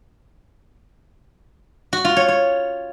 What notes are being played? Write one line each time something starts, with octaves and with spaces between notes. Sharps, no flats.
F#4
F4
C#5
C#5